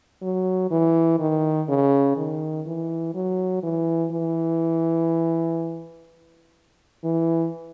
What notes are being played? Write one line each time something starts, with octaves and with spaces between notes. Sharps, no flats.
F#3
E3
D#3
C#3
D#3
E3
F#3
E3
E3
E3